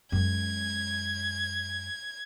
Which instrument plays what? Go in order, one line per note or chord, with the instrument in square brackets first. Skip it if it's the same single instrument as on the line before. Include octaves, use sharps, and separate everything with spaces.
[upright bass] F#2 G#3 [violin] G#6